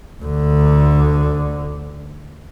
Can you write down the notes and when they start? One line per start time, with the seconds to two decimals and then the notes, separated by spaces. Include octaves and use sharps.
0.22 D2 D3